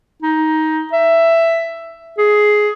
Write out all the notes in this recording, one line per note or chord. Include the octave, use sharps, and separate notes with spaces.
D#4
E5
G#4